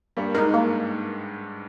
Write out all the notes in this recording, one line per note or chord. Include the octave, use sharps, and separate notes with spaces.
G2 G3 A#3
G#2 G#3 D#4 A#4
A#3